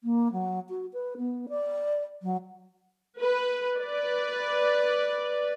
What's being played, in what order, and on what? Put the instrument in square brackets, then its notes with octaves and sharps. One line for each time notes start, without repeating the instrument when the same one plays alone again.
[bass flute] A#3
F#3
F#4
B4
B3
D5
F#3
[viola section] B4
B4 D5